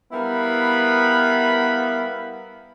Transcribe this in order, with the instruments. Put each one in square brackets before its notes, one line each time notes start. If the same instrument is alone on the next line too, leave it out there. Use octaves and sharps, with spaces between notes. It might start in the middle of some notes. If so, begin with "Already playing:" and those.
[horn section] G3 B3 E4 A#4 F5 B5